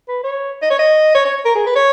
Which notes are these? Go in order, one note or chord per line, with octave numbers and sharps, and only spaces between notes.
B4
C#5
D#5
C#5
D#5
C#5
C#5
A#4
G#4
B4
C#5